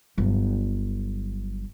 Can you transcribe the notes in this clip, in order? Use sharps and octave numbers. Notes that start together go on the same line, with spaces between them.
G1 F#3